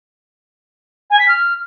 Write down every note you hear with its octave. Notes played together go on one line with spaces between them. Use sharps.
G#5
B6
F6